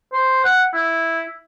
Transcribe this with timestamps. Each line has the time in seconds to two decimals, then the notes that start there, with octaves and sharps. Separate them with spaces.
0.13 C5
0.45 F#5
0.74 E4